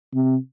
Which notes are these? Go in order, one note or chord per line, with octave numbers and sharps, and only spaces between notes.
C3